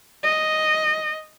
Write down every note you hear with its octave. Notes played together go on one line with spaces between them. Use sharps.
D#5